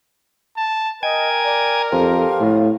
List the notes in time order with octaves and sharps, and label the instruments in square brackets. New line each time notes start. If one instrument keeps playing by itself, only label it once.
[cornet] A5
[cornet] A#4 [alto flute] D#5 [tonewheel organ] G5 G#5 G#6
[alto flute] D5
[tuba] F2 [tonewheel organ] G4 A4 C5 [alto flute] F5
[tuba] A2